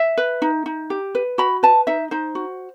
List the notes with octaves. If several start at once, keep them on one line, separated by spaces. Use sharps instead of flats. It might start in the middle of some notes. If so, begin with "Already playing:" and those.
Already playing: E5
B4
D#4
D#4
G4
B4
F#4 B5
B4 A5
D#4 E5
D#4 C5
F#4